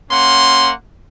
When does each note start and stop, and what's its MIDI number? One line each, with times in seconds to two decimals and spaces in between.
0.11 0.72 58
0.11 0.72 61
0.11 0.72 78
0.11 0.72 84